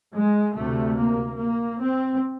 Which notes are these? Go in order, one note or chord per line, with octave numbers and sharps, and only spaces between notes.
G#3
D2 C3 A3
A#3
A#3
C4